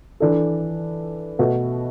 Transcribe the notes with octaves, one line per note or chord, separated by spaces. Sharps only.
E3 D4 A4
B2 A3 F#4 B4